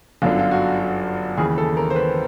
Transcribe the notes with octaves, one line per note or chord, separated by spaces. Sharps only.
G1 F#2 D3 F4
F4
F#4
F#4
D#2 C#3 E3 G#4
A4
A#4
C5
B4